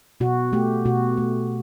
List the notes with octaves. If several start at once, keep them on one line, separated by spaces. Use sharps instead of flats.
B2 F#4
A3 G4
B2 F#4
A3